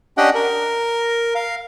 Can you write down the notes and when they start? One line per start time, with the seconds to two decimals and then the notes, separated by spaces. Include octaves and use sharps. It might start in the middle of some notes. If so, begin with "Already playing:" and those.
0.17 C#4 D4 G4 D#5 F#5 G5
0.35 A#4
1.35 F5